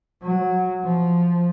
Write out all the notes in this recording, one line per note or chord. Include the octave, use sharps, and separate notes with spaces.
F#3
F3